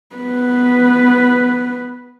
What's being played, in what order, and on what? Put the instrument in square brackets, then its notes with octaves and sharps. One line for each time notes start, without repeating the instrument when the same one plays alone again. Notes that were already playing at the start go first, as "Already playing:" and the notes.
[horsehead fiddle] B3 B4